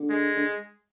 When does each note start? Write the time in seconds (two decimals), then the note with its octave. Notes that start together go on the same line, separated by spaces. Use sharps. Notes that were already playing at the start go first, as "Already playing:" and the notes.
Already playing: D3
0.10 G#3
0.36 D3